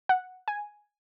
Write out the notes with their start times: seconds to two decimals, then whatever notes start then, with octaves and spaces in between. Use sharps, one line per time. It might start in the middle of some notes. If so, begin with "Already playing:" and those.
0.09 F#5
0.48 G#5